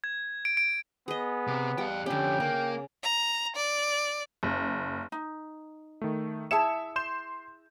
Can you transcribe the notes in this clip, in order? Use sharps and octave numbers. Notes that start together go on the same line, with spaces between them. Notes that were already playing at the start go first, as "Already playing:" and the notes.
G#6
D7
D7
B3 G#4 D#5
C3
G3 F5 G5
F2 D3 C#4 G4 G5
C#3 A#3
A#5
D5
F#1
D#4
D#3 A3
E4 G#4 E5 A5 C#7 E7
C6 G6 E7